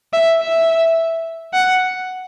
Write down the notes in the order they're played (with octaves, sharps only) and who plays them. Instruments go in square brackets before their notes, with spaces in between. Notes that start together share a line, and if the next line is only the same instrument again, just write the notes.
[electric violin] E5
E5
F#5